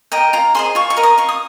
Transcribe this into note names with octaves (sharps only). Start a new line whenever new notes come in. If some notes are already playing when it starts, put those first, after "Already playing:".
A#4 D#5 G5
F4 A#5
G#4 C5 D#5 C6
F4 C#6
C#6
A#4 D#5
D#6
F4 C#6
D#6